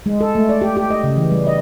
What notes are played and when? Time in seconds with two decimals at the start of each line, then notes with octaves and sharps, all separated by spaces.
0.06 G#3
0.21 A4
0.35 A3
0.49 D5
0.62 G4
0.77 G4
0.91 D#5
1.04 C#3
1.16 E3
1.31 G3
1.47 D#5